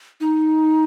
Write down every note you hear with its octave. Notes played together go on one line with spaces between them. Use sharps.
D#4